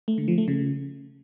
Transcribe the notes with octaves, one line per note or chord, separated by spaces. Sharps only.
A3
D3
F3
A3
C#3